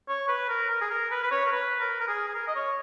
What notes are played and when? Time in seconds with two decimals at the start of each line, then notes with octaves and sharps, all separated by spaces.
0.08 C#5
0.28 B4
0.49 A#4
0.70 A#4
0.81 G#4
0.91 A#4
1.11 B4
1.24 B4
1.31 C#5
1.46 A#4
1.52 B4
1.80 A#4
2.01 A#4
2.08 G#4
2.28 G#4
2.35 A#4
2.48 D#5
2.56 C#5